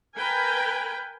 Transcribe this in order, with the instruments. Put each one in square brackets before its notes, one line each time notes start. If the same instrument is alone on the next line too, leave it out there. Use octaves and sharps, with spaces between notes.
[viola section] A#4 B4 G5 G#5